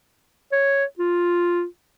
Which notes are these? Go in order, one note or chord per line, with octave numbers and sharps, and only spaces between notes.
C#5
F4